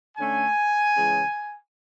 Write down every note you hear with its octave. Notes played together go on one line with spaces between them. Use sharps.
D3 A3 C#4 G#5
C#3 E3 G#3 C#4